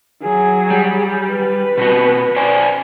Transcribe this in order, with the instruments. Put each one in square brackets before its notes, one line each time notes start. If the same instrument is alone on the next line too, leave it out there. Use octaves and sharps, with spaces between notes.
[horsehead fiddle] F#3 G#4
[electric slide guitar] G3
[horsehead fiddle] B4
[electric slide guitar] B2 C4 F#4
C5 D5 G#5